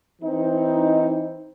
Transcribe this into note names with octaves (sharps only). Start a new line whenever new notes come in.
E3 C4 D#4